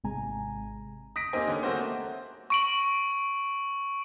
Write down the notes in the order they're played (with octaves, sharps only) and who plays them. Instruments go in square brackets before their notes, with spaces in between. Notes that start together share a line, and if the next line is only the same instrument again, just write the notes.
[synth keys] G#1 C3 G#3 G#5 A#5
[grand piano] D#6 A#6 B6 D7
A#3 C4 D#4 G4 D#5 G#5
D3 C#4
A3 A#3 C4 F#4 C5
[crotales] C#6 D7 F#7